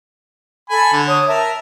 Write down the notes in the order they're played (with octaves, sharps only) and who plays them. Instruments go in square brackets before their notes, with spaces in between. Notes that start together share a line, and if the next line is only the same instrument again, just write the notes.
[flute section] A4 [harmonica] G#5 B5
[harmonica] D3
[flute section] C#5 D#6
[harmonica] A#4 [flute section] E5 G5 A5